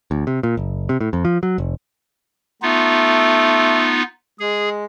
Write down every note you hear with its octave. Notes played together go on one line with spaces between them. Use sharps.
D2
C3
A#2
F#1
C3
A2
F2
F3
F#3
F1
A3 B3 D#4 F4
G#3 G#4